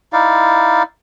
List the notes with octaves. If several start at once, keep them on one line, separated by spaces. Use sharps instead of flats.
D#4 E4 D5 F5